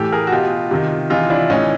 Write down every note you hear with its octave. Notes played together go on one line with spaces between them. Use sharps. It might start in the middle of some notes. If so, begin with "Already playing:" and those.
Already playing: A2 E3 G4 A4
G#4 A#4
F#4
B2 F4 G4
C3 D#3
C3 E3 D#4 F4
D4 E4
A2 E3 C#4 D#4